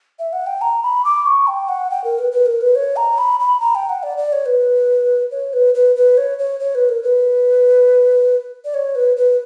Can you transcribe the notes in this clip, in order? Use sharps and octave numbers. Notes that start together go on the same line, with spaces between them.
E5
F#5
G5
A#5
B5
D6
C#6
G5
F#5
G5
A#4
B4
B4
A#4
B4
C#5
A#5
B5
B5
A#5
G5
F#5
D5
D5
C#5
B4
C#5
B4
B4
B4
C#5
C#5
C#5
B4
A#4
B4
D5
C#5
B4
B4